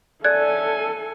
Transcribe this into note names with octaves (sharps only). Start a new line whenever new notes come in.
C#4 A4 D5 E5 G#5 F#6 G#6